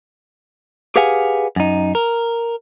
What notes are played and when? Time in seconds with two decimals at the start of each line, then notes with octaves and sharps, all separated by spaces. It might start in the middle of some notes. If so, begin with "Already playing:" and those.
0.96 G4 G#4 B4 F5 F#5 G#5
1.56 F#2 D#4
1.95 A#4